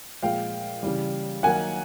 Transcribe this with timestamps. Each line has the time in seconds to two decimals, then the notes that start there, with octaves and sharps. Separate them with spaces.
0.23 A#2 F3 G#3 F5 G5
0.83 C#3 E3 G3
1.43 D#3 F#3 A#3 D#4 F#5 G#5